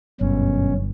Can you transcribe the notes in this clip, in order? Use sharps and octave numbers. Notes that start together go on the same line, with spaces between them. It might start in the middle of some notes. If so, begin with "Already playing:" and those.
G1 F#2 B2 C#4